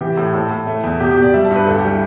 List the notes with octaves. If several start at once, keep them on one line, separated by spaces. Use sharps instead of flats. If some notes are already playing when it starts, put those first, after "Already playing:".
E3 G4
A2
A2 A4
A2
A3
E2
B2 G4
G4
B2 D5
G3 E5
A5
G2
B4
D2 A4
G4
G3
E4